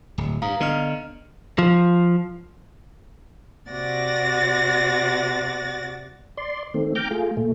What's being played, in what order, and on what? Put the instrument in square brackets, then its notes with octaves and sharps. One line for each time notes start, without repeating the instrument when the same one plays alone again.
[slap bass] D1
[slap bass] G2 [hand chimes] F5 A#5 D#6
[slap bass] D3 [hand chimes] B3 D#5 F6
[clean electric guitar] F3
[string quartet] C3 F#4 D5 F#5 A6 A#6
[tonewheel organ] D5 C6
D#3 A3 C4
G5 A#5 D6 F6 G6
A3 F4 G#4
A#2 A3